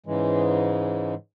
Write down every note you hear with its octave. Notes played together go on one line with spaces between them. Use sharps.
G#2 C#3 E3 G#3